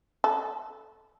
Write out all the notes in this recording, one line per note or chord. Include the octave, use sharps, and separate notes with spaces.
A4